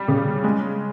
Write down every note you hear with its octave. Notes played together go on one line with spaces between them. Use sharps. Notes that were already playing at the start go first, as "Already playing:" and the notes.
Already playing: G3
C#3
G#3